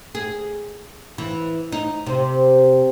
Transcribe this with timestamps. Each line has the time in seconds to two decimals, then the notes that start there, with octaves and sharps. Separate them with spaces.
0.15 G#4
1.18 E3
1.72 D#4
2.06 C3